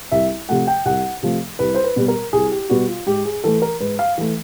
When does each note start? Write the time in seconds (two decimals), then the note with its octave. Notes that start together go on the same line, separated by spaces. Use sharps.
0.12 C2 E5
0.49 C3 F3 A3 F#5
0.67 G5
0.86 C2 F#5
1.23 C3 F3 A3
1.59 C2 B4
1.75 C5
1.84 B4
1.96 B2 G3 B3
2.08 A#4
2.33 C2 G#4
2.52 G4
2.70 B2 G3 B3 F#4
2.88 F4
3.07 G#2 G4
3.25 G#4
3.44 E3 A3 A4
3.62 A#4
3.80 G#2 B4
3.99 F5
4.18 E3 A3